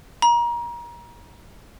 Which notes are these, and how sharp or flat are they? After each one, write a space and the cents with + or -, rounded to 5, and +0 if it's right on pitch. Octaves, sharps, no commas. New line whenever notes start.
A#5 +30